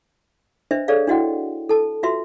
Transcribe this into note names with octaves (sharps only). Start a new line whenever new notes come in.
D4 B4 C5 D#5 E5
G#4 A4 C#5 D5 F5
D4 E4 F#4 D#5 F#5 G5
A4 A5
F4 F#4 B4 E5 C6